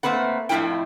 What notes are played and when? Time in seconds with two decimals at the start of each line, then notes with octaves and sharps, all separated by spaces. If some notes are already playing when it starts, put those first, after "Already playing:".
0.03 A3 A#3 C4 B4 F#5
0.49 F2 A2 C#4 E4 F4 G5